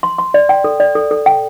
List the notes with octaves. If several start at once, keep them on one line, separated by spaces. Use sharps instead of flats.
C6
C6
D5
G5
A4
D5
A4
A4
G5